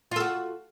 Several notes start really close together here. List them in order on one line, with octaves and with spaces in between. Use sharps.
F4 A4 F#4